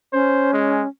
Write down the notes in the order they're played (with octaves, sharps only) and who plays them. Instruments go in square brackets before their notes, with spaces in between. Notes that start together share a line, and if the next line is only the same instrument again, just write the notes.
[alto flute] C#4 [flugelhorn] C5
[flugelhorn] G#3